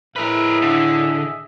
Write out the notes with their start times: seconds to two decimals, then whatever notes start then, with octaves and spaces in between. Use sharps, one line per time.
0.16 A2 G#4 A#4 B4 D#5 E5
0.62 D3